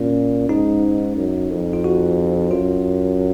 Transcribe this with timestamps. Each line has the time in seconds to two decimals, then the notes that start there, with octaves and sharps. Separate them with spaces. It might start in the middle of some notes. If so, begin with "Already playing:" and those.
Already playing: A#2 C#4
0.49 G#2 D#4
1.17 F#2
1.50 F2
1.73 F4
1.84 F#4
2.51 F#2 F4